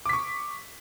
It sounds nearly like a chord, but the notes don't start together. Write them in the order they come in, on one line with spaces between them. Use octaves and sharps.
D6 B6 C#6